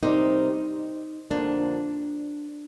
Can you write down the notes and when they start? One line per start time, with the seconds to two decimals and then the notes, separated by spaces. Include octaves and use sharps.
0.02 C3 G3 C4 D#4 G4 A#4
1.30 F2 D3 F3 A#3 D4